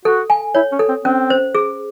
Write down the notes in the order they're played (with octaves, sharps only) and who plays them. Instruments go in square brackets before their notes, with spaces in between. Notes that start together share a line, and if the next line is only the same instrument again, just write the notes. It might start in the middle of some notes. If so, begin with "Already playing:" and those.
[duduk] F#4 [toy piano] A4
[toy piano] G#5
[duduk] E4 [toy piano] C#5
[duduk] C#4
[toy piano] A4
[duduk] C4
[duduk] C4 [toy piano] C#4
[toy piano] C5
G#4